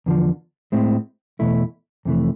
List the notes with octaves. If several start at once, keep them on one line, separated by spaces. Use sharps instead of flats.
E2 D3 F3
A2 G#3 C4 E4
E2 B2 A3 E4
F2 C3 E3 A3